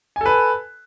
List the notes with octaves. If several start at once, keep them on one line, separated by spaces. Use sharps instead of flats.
A4 B4 G#5